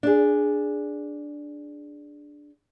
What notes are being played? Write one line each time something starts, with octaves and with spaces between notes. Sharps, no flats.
D4 G#4